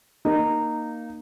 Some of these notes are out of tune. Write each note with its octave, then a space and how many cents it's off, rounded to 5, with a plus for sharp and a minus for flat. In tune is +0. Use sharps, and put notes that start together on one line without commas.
A#3 +0 D#4 -15